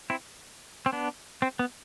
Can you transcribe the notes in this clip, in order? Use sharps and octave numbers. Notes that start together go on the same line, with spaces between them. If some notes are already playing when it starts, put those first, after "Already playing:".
C4 E4
C4
B3 D4
C4
B3